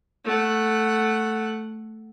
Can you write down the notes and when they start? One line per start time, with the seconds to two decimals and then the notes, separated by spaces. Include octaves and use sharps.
0.25 A3 F#5